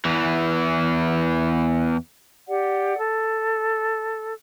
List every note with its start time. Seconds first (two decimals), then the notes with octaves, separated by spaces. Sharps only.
0.05 E2 E3
2.47 G4 D5 F#5
2.97 A4